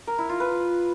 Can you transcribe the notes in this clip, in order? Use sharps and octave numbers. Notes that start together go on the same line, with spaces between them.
A#4
E4
F4
B4